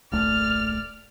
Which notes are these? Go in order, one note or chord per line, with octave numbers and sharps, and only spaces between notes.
D1 A#1 A3 D5 F6